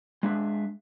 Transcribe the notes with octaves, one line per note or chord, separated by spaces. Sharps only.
G#3 D4 E5